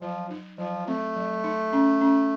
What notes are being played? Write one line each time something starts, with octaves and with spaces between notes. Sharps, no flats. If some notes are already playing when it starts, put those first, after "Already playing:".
F3 F#3
D#4
F3 F#3
A3 C4
F#3
D#4
C#4
C#4